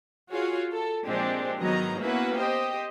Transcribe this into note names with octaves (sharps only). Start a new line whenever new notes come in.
F4 F#4 G#4 C#5 F5
A4
A#2 F3 G#3 C4 D4 G4
G#2 D#3 F#3 B3 D#5 A#5
A#3 B3 C#4 E4 F#4 B4
G4 C5 D#5